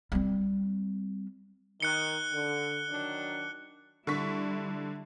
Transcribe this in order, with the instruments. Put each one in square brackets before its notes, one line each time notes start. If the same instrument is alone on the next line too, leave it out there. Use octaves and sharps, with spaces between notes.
[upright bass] G3 C4
[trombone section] D#3 [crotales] F#6 C#7 G7
[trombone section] D3
D#3 F#3 D4
[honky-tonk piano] D3 C#6 B6 [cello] G3 E4